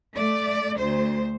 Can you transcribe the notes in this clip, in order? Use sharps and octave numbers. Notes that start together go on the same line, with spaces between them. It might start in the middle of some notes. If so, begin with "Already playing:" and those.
A3 D5
D2 C5